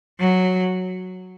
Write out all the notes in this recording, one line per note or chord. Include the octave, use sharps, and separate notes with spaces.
F#3